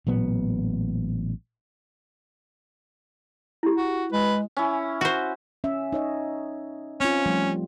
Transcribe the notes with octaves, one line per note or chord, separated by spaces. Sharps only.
A1 A#2 F#3 B3
E4 G4
F#4
G#3 B4
C#4 E4
F#4 C5
C#4 E5
D#4 C#5 D#5
C4 C#4 F4
F3 G3 A3